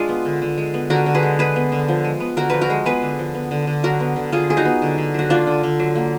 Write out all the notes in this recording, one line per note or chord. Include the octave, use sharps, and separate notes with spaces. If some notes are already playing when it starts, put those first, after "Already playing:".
Already playing: G#3 D4 F4 G#4
B3
D3
D3
G#3
B3
D3 F#4 A#4
D3
G#4 B4
G#3
G#3 G#4 B4
B3
D3
F3
G#3
B3
D3 F#4 A#4
F3 B4
F#4 A#4
G#3
B3 G#4 B4
D3
F3
B3
D3
D3
F#3 F#4 A#4
B3
D3
D3 F4 G#4
F#3 G#4
D#4 F#4
B3
D3
D3
F#3 F#4
A#3 D4 F4
D3
D3
F#3
A#3